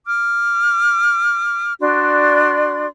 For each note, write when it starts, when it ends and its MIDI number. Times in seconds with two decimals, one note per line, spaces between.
0.07 1.72 86
0.07 1.72 89
1.80 2.87 62
1.80 2.87 66
1.80 2.87 74
1.80 2.87 84